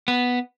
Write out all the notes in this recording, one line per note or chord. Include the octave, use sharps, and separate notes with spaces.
B3